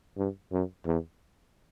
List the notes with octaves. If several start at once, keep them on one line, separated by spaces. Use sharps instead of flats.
G2
F#2
E2